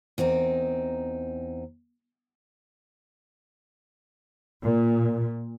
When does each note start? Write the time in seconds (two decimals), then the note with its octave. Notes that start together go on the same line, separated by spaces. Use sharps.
0.18 E2 C4 D#4 A#4
4.63 A#2